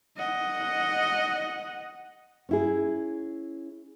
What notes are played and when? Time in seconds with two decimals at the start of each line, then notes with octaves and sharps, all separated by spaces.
0.17 D#5 F#5
2.49 C#4 E4 G#4